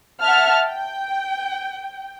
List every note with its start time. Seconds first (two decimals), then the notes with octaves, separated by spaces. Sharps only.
0.19 E5 F#5 A5 F6
0.67 G5